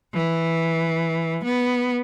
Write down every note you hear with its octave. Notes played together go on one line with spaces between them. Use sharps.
E3
B3